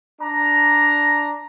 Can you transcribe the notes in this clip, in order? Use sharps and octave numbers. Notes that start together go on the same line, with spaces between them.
D4 A#5